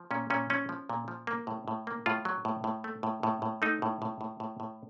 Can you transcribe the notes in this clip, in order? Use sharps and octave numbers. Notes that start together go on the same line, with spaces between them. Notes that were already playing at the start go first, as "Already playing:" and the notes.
Already playing: F3
A#2 C#4
A#2 C#4
F3 C#4
F3
A#2
F3
A#3
A2
A2
A#3
A2 F4
F#3
A2
A2
A3
A2
A2
A2
A3 D#4
A2
A2
A2
A2
A2